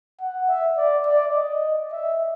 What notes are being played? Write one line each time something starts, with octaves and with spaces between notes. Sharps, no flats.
F#5
E5
D5
D5
D#5
E5